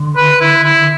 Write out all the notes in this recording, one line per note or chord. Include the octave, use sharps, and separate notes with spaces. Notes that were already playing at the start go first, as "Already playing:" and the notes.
Already playing: D3
B4
E4
E4